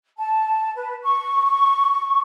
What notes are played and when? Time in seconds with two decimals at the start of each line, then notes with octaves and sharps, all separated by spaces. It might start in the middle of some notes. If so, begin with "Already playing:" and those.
0.17 A5
0.75 B4
1.02 C#6